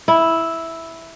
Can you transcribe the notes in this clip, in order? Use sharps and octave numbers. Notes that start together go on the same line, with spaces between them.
E4